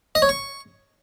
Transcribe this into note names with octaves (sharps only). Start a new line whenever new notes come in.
D#5
C#5
C#6